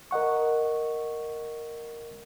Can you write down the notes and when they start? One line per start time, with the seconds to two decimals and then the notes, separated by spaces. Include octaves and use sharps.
0.11 A#4 D#5 F#5 C#6